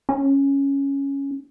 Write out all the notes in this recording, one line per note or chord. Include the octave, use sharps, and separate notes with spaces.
C#4